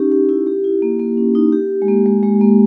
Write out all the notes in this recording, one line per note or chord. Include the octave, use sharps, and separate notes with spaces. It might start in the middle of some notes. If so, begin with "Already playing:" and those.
Already playing: C#4 D#4 G4
G4
E4
G4
E4
A#3
A#3
C#4
D#4
G4
G#3
A#3
G#3
G#3
A#3